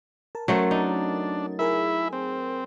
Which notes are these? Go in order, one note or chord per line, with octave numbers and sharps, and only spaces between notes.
A#4 A5
F#3 A3 C#4 A#4 C5 A6
D4 D#4
E4 G#4 A#4 E5 G#5
C4